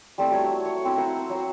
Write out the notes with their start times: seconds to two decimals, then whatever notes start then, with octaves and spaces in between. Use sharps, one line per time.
0.18 G3 A3 C4 E4
0.31 F#3 C#5 A5
0.65 C#5
0.84 C4 E4
0.98 C5 F#5 A#5
1.29 F#3 C5